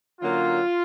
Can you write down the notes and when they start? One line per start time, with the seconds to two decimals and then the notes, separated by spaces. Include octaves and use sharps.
0.20 D3 F#3 A#3 C#4 F4